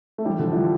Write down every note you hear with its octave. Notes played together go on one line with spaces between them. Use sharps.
A3
E3 G3
D3 F3
E3 G3